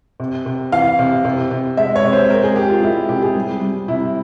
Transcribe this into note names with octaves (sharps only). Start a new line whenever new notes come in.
C3
C3
E3 F5
C3
C3
C3
G#3 E5
C#5
C3
C5
G#3 A#4
G#4
G#3 G4
F4
G#3 E4
C3 G4
G#4
G3
G3
C3 E4